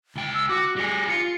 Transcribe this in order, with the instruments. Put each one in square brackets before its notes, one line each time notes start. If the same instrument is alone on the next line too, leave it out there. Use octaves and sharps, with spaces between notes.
[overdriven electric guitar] C#2 G5
[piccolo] E6
[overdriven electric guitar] F#4 [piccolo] D6
[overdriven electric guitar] G3 G#4 [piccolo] A#6
[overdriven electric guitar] F4 [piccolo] C#7